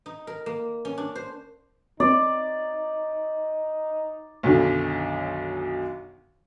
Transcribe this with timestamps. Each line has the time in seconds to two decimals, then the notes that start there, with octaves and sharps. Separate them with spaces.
0.06 D#4
0.27 A#4
0.46 A#3
0.85 C#4
0.98 D4
1.15 C5
2.00 C4 D#4 D5
4.43 B1 F#2 D3 D#3